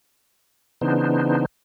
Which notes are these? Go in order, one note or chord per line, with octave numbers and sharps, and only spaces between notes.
C#3 E3 B3 D4 D#4 C5